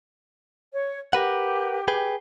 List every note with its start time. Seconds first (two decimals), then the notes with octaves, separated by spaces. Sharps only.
0.73 C#5
1.13 G4 A#4 B4 F#5
1.88 G#4 B4 G5